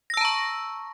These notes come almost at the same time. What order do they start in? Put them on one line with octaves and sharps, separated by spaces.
A#6 E6 A5 A#5 C#6